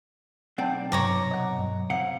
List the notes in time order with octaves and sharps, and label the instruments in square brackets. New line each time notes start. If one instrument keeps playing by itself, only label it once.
[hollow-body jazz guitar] B1 C4 D5 [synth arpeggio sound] F#5 G5 A5
[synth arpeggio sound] G2 C3 F#3 [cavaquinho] C#5 A#5 D6
[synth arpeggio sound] D#5 F#5
G2
[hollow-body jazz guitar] C3 F5 F#5